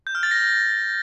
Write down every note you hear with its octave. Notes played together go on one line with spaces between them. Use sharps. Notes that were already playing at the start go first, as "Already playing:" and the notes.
G6
F6
A6
A#6